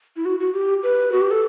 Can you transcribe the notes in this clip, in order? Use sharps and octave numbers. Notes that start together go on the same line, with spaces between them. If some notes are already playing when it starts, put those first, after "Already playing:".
E4
F#4
F#4
G4
B4
F#4
G4
A4